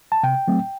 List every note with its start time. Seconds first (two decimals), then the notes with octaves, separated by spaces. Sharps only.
0.12 A5
0.23 C3 G5
0.48 F#3 A3 C4